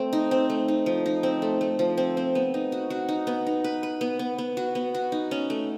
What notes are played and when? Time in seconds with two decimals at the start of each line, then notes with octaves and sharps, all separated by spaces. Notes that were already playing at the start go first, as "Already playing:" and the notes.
Already playing: A3 C4
0.13 D#4
0.31 C4
0.50 A3
0.68 D#4
0.86 F3
1.06 D#4
1.23 C4
1.42 A3
1.61 A3
1.79 F3
1.98 C4
2.17 C4
2.35 B3
2.54 D#4
2.72 F#4
2.90 F#4
3.09 D#4
3.27 B3
3.47 D#4
3.64 B4
3.83 B4
4.01 B3
4.19 B3
4.38 B3
4.57 F#4
4.75 B3
4.95 F#4
5.12 D#4
5.31 C#4
5.50 A3